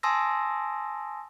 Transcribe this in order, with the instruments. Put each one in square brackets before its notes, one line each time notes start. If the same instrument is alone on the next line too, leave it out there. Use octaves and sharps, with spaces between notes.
[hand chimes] G#5 A5 C6 D#6 E6 A#6